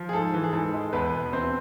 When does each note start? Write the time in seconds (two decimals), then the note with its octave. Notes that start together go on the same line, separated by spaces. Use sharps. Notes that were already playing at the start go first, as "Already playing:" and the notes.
Already playing: F3
0.09 G#4
0.13 G#2 A4
0.34 E3
0.44 G#4
0.53 G#2 A4
0.74 G#3
0.93 E2 B3 B4
1.13 B2
1.33 E2 C4 C5